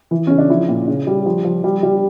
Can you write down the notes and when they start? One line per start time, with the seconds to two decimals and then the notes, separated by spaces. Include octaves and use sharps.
0.11 E3
0.27 C#3 C#4
0.38 D4
0.50 F3 E4
0.68 A#2
0.88 C#3
1.07 G3
1.26 F3
1.45 F3
1.64 G3
1.83 G3